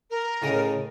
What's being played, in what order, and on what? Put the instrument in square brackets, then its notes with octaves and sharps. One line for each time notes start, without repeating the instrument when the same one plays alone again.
[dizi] A#4
[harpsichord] A2 C#3 D#5